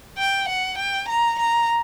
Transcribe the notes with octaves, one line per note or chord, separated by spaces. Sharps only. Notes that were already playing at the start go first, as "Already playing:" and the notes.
G5
F#5
G5
A#5
A#5